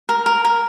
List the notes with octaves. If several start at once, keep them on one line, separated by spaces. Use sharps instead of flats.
A#4
A#4
A#4